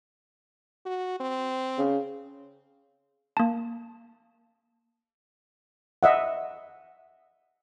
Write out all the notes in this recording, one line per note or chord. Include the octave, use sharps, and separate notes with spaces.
F#4
C4
C#3
A#3 A5
D#5 E5 F#5